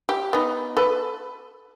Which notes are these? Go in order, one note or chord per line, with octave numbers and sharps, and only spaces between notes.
G4
B3 D#4
A4 B4